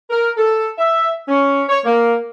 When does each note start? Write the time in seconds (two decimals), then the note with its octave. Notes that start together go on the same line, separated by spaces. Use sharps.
0.10 A#4
0.37 A4
0.78 E5
1.28 C#4
1.69 C#5
1.85 A#3